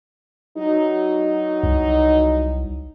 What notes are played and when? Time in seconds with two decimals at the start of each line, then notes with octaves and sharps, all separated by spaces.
0.57 F#3 D#4
1.63 C2